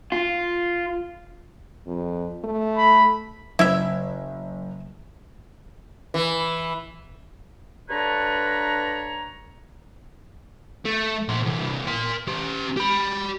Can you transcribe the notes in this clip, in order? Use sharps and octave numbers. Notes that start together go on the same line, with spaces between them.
F4
F2
A3
B5
F#1 E4 E5
E3
G2 D3 D4 B4 C#5 A#5
A3
A#2 C5
C2 E3
A#4 C6
C#4 G4
G4 B5